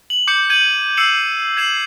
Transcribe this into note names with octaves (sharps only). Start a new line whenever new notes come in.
F#7
D6 G6 C#7
G6 G#6 D#7 F#7
E6 C7 C#7 E7 F#7
G#6 C7 E7 F#7